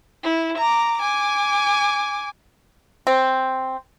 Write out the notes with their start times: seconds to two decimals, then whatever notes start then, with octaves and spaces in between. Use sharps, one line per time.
0.23 E4
0.58 A#5 D6
0.97 G#5 D6
3.07 C4